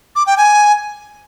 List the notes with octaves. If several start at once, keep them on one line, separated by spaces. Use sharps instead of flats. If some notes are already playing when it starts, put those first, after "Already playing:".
D6
G5
G#5